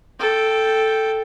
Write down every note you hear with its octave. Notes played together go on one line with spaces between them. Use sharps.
A4 G5